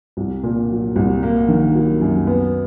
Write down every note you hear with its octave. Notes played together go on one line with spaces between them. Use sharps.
C2
A#2
F#3
C2
A#3
D#3
F#3
F#2
B3